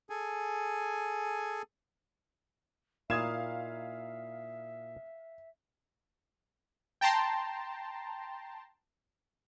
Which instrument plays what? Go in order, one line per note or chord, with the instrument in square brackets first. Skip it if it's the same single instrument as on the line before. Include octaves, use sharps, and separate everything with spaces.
[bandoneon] G#4 A4 G#5
[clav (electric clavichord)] A#2 D#4 E4 [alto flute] E5 [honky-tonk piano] F5 [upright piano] D#6 G#6 E7
[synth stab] G5 A5 A#5 C6